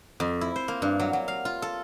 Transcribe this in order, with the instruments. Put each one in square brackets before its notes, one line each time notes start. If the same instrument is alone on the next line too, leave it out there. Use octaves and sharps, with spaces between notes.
[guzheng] F2
E4
C5
A#3
G2
F#3
F#3
F5
F4
A4